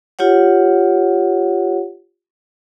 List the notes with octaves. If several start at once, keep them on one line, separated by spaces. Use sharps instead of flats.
F4 G4 C#5 F#5